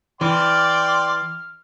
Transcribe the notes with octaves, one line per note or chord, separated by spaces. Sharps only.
E3 D5 G5 C6 D6 F6